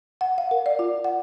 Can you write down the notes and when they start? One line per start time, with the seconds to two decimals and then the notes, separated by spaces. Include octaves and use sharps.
0.21 F#5
0.38 F5
0.51 A#4
0.66 D5
0.79 F4
1.04 F#5